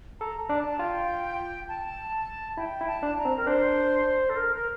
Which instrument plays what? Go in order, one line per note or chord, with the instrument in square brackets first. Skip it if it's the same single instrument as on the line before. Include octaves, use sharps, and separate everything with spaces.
[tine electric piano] A4 [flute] A#5
[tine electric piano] D4 [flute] A5
[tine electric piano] F4 [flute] G5
[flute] A5
[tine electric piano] E4 [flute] G5
[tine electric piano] E4
[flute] A5
[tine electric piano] D4
[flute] A#5
[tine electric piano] C4
[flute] A#4
[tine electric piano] D4 [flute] C5
[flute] A4
A#4
A#4